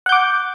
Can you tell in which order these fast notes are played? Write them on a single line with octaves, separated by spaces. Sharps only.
F#5 G6 D6